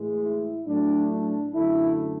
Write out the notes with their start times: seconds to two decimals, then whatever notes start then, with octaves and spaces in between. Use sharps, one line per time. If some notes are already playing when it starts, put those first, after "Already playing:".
Already playing: A2 E3 G#3
0.23 E4
0.67 A2 F#3 A3 D4
1.11 D4
1.55 F#2 D3 A3 E4